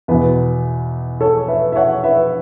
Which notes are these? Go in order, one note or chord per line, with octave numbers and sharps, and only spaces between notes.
E2 B2 B4
A4 C#5
B4 E5
E5
C#5 F#5
B4 E5